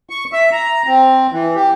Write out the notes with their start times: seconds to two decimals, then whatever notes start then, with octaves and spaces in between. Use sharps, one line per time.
0.10 C#6
0.32 E5
0.52 A#5
0.87 C4
1.32 E3
1.55 G4